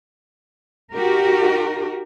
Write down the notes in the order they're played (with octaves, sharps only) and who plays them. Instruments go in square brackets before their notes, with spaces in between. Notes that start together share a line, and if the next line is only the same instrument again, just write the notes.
[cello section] D#4 F#4 G4 A#4